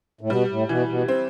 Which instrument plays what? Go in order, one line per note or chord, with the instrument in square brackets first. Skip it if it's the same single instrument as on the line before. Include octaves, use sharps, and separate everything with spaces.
[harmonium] A2
[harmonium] B2 [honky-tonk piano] G3
[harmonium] A2
[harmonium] B2 [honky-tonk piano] E3
[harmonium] B2
[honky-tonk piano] C4